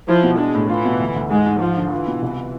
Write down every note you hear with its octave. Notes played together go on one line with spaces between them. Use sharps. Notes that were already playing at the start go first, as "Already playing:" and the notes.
F3 E4
B2
G#3 D4
A2
E3 F4
B2
D2
D2
G#2 G#3
G#2
F3 F4
D3
E3 F4
B2
C2